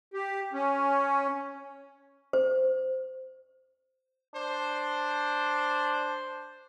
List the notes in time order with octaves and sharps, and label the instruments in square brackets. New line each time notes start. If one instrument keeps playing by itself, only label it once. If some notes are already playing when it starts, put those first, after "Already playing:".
[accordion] G4
C#4
[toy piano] C5
[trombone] D4 [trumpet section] C5